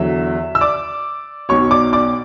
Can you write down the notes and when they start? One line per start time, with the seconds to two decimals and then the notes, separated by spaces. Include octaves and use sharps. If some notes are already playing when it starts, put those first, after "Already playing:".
Already playing: E2 D3 F#3 E5
0.55 E6
0.61 D5 D6
1.49 B1 B2 F#3 C#5 C#6
1.71 D5 D6
1.93 D5 D6